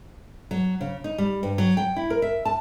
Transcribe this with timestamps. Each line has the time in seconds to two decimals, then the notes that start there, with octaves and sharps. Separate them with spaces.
0.51 F#3
0.81 C#3
1.04 D#4
1.18 G3
1.43 G2
1.58 F#3
1.77 G5
1.96 E4
2.10 A#4
2.22 E5
2.45 A5